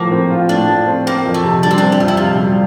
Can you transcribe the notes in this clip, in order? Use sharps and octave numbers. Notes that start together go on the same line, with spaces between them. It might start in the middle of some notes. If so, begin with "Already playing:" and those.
Already playing: A2 F3 A#3
C4
F4
A2 D4
F3
C4
A#3 C4
F2
A3
C3
G3 D4
C4
D4
C4
G4
F2 F4
E4
C3 F4
G3